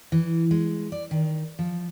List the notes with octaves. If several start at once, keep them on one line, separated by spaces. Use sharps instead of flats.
E3
G#3
D5
D#3
F3